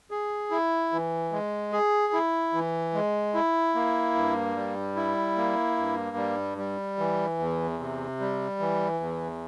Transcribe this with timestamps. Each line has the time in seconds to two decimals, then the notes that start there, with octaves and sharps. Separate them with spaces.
0.11 G#4
0.51 E4
0.92 E3
1.32 G#3
1.72 G#4
2.13 E4
2.53 E3
2.94 G#3
3.34 E4
3.75 A#3
4.15 G2
4.56 G3
4.96 E4
5.37 A#3
5.77 G2
6.17 G3
6.58 G3
6.99 E3
7.39 E2
7.79 C3
8.20 G3
8.60 E3
9.00 E2